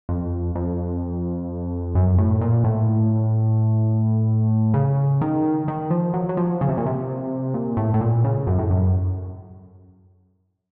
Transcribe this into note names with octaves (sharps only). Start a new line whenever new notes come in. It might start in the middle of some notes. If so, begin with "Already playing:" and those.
F2
F2
F#2
A2
A#2
A2
C#3
D#3
D#3
F3
F#3
F#3
F3
C#3
C3
A#2
C3
A#2
A2
A2
A#2
C#3
F#2
A2
F#2